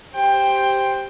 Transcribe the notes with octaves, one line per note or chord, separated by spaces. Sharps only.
G4 C5 G5